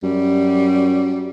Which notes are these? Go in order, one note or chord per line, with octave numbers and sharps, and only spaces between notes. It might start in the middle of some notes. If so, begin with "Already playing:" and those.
F#2 G3